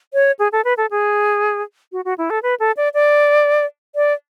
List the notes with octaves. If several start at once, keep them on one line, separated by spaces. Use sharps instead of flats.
C#5
G#4
A4
B4
A4
G#4
F#4
F#4
E4
A4
B4
A4
D5
D5
D5